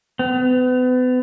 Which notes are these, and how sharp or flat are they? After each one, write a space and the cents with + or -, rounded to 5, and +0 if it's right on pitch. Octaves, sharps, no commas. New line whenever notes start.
B3 +35